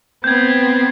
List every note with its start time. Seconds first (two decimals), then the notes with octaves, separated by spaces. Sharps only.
0.24 B3 C4 G6 G#6